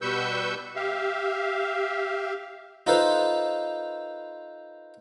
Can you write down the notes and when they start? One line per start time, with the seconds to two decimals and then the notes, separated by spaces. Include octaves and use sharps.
0.02 B2 G3 B4 C#6 E6 G6
0.76 G4 E5 F5
2.87 D#4 F4 A4 B4 C5